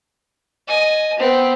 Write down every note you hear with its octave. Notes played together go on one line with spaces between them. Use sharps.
D#5 G#5
B3 C4